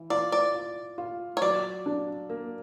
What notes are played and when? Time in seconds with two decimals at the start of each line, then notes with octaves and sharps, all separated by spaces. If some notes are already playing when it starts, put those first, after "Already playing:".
Already playing: E3
0.10 F4 D5
0.32 D5
0.54 F4
0.98 F4
1.37 C#5
1.42 F#3 D5
1.86 D4
2.29 A#3